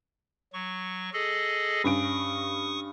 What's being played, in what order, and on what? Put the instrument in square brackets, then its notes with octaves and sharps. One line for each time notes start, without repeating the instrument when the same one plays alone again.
[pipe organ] F#3 C#6
G#4 A4 D#5
[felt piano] G2 C#4 D7 [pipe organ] C#6 D#6